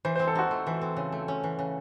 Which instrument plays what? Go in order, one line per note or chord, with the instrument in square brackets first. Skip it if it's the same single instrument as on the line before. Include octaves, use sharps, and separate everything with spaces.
[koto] E3 [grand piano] C5
[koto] C4 [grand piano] C5
[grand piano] A4
[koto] D#4 [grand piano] F#4
[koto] A3
E3
C4
C#3
A3
C#4
E3
C#3